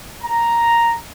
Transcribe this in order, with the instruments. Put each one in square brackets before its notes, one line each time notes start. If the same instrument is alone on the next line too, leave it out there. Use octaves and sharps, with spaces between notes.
[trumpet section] A#5